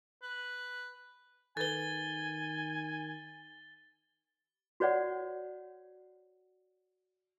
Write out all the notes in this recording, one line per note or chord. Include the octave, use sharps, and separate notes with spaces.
B4
D#3 A4 B4 G#5 A6 G7
F#4 B4 C#5 D5 F#5